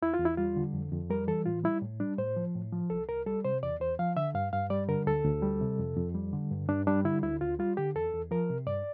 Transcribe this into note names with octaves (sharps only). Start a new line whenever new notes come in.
E2 E4
F4
E2
E4
G3 F4
D3
F2
F2
G3 A#4
E3 A4
A2 F4
G3 E4
A2
G3 D4
A2 C5
F3
A2
F3
C2 A4
C2 A#4
G3 A4
C3 C5
E2 D5
E2 C5
F3 F5
D3 E5
G2 F5
G2 F5
G3 D5
D3 A#4
D2 A4
D2
G3
C3
F2
F2
G3
D3
G2
G2 D4
G3 D4
D3 E4
D2 E4
D2 F4
G3 F4
D3 G4
E2 A4
E2
F3 A#4
C3
G2 D5